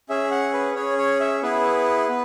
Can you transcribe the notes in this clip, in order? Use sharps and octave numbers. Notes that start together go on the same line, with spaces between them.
C#4 G#4 E5
F#5
B4
C#4 G#4 C#5
C#5
E5
B3 E4 G#4 B4
B3